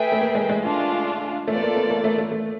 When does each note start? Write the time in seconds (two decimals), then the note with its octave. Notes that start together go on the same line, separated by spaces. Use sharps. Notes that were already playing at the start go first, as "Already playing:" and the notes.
Already playing: A3 G#4 B4 E5 G5
0.12 A3
0.21 A#3
0.35 G#3
0.49 G#3
0.63 A3 D4 F4
1.48 A3 F4 A4 D5
1.55 B3
1.62 A#3
1.76 B3
1.90 A#3
2.04 A3
2.18 A3
2.32 A3